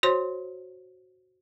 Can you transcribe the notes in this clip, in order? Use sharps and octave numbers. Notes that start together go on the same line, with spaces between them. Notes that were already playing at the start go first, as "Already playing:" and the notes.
F#4 C5 C#5 C6